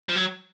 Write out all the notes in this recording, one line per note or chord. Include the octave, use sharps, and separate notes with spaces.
F3
F#3